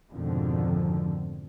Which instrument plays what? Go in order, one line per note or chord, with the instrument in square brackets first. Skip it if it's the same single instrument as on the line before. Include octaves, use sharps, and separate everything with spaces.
[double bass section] F2 G#2 B2 D3 D#3 F3